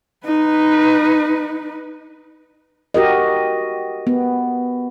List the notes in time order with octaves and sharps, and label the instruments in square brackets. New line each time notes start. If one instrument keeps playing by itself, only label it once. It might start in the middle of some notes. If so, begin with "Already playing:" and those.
[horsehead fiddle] D#4 B4
[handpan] F#4 G4 A#4 D#5
B3